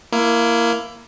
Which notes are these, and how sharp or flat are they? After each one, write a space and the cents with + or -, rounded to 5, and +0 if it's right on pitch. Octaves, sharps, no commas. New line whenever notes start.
A#3 +0 E4 +20